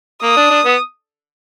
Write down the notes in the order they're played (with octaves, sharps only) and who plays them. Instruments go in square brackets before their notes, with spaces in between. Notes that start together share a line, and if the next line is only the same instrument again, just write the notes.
[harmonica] A#3 [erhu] D#6
[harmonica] D4
D4
B3